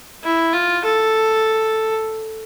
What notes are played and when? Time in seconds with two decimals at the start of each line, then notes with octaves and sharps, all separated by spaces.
0.23 E4
0.53 F4
0.84 A4